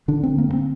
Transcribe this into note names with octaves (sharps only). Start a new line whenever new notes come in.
D3 D4
C4
D3
A#3
G2
C4